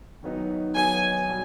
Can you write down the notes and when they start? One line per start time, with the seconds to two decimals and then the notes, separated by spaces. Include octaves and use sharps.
0.23 D#3 F#3 B3 D#4
0.75 D#3 F#3 B3 D#4 G#5
1.29 B2 G3